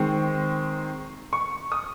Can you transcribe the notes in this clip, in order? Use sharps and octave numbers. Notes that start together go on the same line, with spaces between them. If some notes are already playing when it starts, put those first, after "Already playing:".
Already playing: D#3 G#3 C4 C#6
C#6
D#6